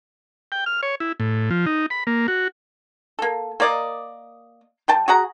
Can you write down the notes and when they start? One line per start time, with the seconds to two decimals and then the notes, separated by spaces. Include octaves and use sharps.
0.52 G5
0.66 F6
0.83 C#5
1.00 E4
1.20 A2
1.50 F3
1.66 D#4
1.90 B5
2.07 A#3
2.28 F#4
3.19 A#3 A4
3.60 A#3 A#4 D5 D#5
4.88 G3 G5 A5
5.08 F#4 G#4 F#5 A#5